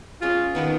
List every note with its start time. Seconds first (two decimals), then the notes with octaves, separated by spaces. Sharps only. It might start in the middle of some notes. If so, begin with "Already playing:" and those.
0.22 G#3 C#4 F4 G#4
0.55 D#3 A#3 B3 D#4 A#4